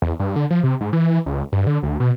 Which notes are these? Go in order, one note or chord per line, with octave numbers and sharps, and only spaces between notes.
E2
G2
D3
F3
C3
G#2
E3
C#2
G2
D3
D2
B2